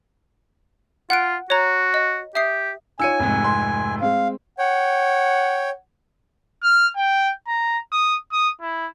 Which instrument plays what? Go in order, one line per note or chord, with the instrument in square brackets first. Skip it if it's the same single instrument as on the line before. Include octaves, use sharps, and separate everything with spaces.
[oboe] F4 [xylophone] F#5 F#6 D7
[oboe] F#4 [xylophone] C#5 A#5
[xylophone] D#5
[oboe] G4 [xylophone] E5 D#6 C7
[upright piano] D#4 F4 C#5 [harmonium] G#5 [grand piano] E6 C#7 D#7
[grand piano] F1 G#2 [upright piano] F2
[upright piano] C6
[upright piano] G#3 C4 [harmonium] F5
[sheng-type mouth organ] C#5 G5 [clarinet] F#5
[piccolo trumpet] F6
G5
A#5
D#6
D#6
E4